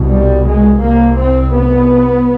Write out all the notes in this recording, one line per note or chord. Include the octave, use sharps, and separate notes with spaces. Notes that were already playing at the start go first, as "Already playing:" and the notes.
Already playing: C2 B2
G3
G#3
C2 C3 A#3
C4
B3